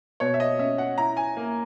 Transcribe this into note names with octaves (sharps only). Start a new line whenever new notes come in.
B2 C#5
E5
D#5
C#4 E5
F#5
E4 A#5
G#5
A#3